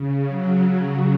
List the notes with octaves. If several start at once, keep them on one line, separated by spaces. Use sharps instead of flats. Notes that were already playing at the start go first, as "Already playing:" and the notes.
Already playing: C#3
F#3